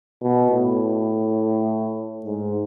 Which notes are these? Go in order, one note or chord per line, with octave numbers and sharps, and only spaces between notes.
B2
A2
G#2